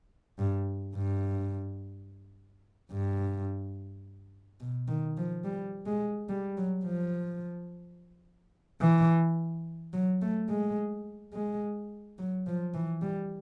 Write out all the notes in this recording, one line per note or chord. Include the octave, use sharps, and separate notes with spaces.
G2
G2
G2
B2
D#3
F3
G3
G#3
G3
F#3
F3
E3
F#3
A3
G#3
G#3
F#3
F3
E3
G3